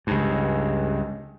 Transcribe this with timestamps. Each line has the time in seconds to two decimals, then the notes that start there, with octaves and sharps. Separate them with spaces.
0.07 C#2 G2